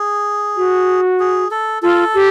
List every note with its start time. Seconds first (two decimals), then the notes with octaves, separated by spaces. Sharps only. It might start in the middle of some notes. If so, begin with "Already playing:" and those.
Already playing: G#4
0.57 F#4
1.20 G#4
1.51 A4
1.83 F4 A4
2.14 G4